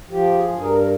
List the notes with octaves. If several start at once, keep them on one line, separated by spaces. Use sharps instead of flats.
F3 G4
G#4
G2
A#4
A#4